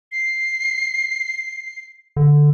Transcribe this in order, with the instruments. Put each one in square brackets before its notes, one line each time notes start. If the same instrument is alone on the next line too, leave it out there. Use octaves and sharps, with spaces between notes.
[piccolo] C7
[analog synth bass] D3